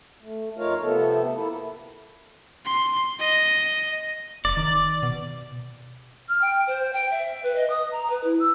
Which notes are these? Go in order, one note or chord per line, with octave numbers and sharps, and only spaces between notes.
A3
F2 D#4 F4 A#4 C#5 F5
C3 F3 A3 B3 A4
A#3 E4 A4
C6
D#5
F1 D5
D#3
B2
F6
G5
C5
G5
E5
B4
D#5
D#6
A#5
B4
E4
E6